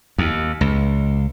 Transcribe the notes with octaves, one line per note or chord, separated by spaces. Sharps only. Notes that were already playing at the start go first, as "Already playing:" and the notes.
D#2
C#2